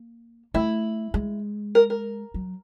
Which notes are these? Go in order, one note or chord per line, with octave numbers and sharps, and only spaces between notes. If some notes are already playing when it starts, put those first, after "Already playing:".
Already playing: A#3
A3 E4
G#3
A#4
A#4
F#3